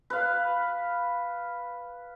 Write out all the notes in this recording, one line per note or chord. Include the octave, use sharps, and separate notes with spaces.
B4 F5